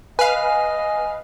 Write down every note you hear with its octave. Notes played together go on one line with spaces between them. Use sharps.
B4 D#5 F5 G#5